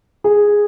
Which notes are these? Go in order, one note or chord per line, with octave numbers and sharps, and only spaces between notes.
G#4